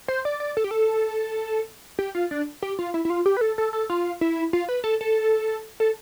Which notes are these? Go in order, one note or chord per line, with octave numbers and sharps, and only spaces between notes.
C5
D5
D5
A4
G4
A4
G4
F4
D4
G4
F4
E4
E4
F4
G4
B4
A4
A4
A4
F4
E4
F4
B4
A4
A4
A4